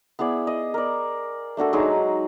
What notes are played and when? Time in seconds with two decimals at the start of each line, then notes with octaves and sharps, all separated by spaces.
0.19 B3 E4 G#4 D5
0.47 D#5
0.74 A#4 D5
1.57 A3 D4 F#4 A4
1.73 F#3 G#3 D#4 G#4